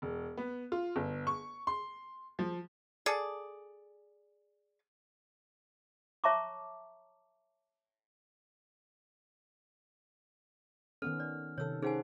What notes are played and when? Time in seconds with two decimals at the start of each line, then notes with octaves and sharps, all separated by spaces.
0.02 E1
0.37 B3
0.72 F4
0.96 G1
1.27 C#6
1.67 C6
2.39 F3
3.06 G#4 A4 D5
6.24 C#5 E5 A5 A#5 C#6 D6
11.02 D#3 B3 C#4 A4 F6
11.20 D5
11.58 C3 D#3 A4 C#5 E6
11.82 C#4 D#4 G#4 C5 F5 F#5 G#5